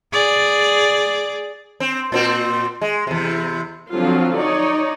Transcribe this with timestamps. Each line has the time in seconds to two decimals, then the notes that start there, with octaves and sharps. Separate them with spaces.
0.12 G#4 D5
1.80 C4
2.12 A#2 C4 F#4
2.81 G#3
3.07 E2 C3
3.92 D3 F3 F#3 C4 F4 A4
4.35 D#4 C#5 D5